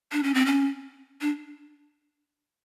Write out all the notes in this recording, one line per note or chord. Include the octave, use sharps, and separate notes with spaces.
D4
C#4
C4
C#4
D4